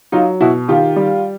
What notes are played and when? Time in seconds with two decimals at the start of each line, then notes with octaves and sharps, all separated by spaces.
0.12 F#3 D#4 F4
0.41 B2 E4 F#4
0.68 D#3 F4 G4
0.96 G3